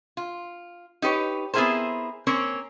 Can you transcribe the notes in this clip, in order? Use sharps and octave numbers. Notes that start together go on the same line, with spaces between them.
F4
D#4 G4 B4 C#5
B3 C4 E4 G#4 A#4 C5
A#3 C4 C#4 A#4 C#5